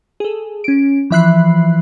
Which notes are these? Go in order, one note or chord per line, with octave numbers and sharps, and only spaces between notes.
G#4 A4
C#4 D7
E3 F3 E5 B5 F#6 C7